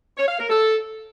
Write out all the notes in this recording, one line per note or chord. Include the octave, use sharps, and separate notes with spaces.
C#5
F5
A#4
A4